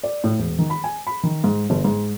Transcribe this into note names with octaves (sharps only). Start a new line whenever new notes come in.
D5
A2
E1
D#3
B5
G#5
B5
D#3
G#2
G1
G#2